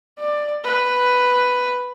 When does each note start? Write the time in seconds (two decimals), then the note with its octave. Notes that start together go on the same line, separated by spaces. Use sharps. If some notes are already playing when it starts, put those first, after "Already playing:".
0.19 D5
0.64 B4